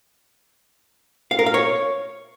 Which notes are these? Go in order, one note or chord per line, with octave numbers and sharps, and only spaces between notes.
F5
A#4
F5
C#5